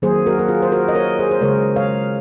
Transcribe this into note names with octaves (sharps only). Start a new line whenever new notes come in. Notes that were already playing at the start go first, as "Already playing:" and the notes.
D#3 F#3 A#3 G#4 C5
F#4 A#4
A#4
F4 G#4
C5
F#4 A#4
D#5
A#4 C#5
G#4 C5
C5
C#3 G#3 A#4 C#5
C#5 F5